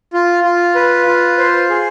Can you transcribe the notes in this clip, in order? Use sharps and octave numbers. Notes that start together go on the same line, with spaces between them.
F4
F4
B4
F4
C5
G#4